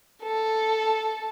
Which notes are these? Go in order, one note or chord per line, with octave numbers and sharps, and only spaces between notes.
A4